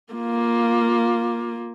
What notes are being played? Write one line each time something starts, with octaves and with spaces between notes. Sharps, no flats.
A#3 F4